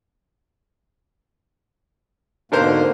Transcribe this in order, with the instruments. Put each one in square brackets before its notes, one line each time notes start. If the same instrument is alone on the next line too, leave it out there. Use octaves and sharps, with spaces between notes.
[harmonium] G#2 B2 A#3 [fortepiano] D3 A#4 C5